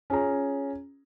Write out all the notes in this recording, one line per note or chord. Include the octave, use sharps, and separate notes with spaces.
C#4 F4 G#4 A#5